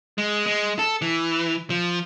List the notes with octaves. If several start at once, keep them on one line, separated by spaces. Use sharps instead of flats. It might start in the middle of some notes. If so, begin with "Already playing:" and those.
G#3
G#3
A4
E3
F3